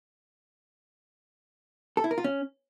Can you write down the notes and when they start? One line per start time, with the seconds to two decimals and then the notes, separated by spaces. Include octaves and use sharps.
1.97 A4
2.04 E4
2.11 A#4
2.18 F4
2.24 C#4